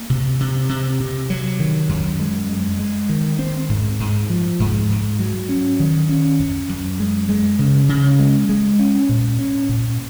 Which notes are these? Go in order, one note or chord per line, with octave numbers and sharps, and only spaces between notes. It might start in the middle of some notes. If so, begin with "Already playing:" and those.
Already playing: A#3
C3
C3
C3
C3
F#3
D#3
F#2
G#3
G#3
G#3
D#3
C4
G#2
G#2
F3
G#2
G#2
F#3
C#4
D#3
C#4
F#2
F#2
G#3
G#3
C#3
C#3
G#3
G#3
C#4
A#2
C#4
A#2